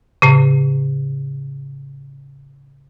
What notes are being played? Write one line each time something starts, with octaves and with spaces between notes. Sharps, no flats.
A2 C#3